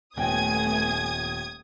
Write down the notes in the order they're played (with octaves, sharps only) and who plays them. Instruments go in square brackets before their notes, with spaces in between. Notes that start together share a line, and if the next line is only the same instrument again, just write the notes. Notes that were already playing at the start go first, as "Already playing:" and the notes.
[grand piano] D#1 G5 [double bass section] A3 B3 [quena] G#5 [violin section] D#6 G#6